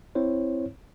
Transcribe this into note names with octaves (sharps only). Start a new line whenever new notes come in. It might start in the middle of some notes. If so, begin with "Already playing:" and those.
C4 E4 C5 C#5